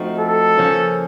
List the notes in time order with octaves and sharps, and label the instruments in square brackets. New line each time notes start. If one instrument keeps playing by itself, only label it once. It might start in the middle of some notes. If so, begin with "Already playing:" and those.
Already playing: [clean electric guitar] F3 A3 C4 D#4 F#4
[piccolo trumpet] A4
[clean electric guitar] C#3 F3 A#3 C#4